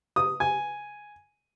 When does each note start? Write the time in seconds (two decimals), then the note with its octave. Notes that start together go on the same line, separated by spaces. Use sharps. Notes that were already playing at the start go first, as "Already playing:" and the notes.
0.16 D#6
0.40 G#5